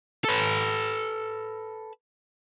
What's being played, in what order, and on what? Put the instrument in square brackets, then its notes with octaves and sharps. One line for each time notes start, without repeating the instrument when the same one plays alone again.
[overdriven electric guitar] A4 B4